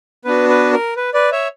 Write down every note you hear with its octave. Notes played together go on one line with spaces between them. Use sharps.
B3 D4 F#4 B4
B4
A#4
B4
B4 D5
C#5 E5